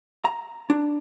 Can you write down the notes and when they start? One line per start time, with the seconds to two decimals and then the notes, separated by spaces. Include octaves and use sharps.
0.25 A#5
0.70 D4